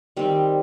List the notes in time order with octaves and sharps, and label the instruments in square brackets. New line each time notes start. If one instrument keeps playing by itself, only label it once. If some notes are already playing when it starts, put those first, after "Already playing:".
[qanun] D#3 G3 C4